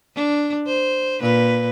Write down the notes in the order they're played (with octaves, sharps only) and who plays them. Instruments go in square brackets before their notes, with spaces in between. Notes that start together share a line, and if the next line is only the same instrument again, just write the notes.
[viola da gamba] D4
C5
A#2 B4